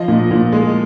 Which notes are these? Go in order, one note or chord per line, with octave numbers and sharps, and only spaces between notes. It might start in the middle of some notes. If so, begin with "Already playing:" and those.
Already playing: F3 D#5
A#2
A#2
G#3